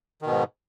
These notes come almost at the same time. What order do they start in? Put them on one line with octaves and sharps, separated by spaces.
D#3 B2 G#2